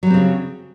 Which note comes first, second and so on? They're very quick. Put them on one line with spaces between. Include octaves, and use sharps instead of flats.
F#3 G3 C4 C#3